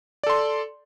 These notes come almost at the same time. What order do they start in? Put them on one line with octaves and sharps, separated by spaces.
D5 A4 C6